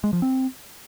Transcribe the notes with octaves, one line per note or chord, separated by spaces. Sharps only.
G#3
F3
C4